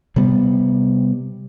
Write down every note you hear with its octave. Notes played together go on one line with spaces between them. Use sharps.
C3 G3 B3